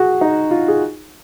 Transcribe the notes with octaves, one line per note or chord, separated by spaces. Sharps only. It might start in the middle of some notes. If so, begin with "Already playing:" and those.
Already playing: F#4 G#4
D#4
F4
G#4